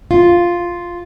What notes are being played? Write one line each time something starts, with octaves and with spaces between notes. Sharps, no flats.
F4